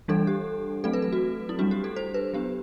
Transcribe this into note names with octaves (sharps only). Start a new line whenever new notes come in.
E3 G3 D4 A4
G4
F#3 A3 C4 A4
B4
A4
F#4
E4
G3 D4 F#4
G4
A4
C5
B4
F#3 B3 D4 G4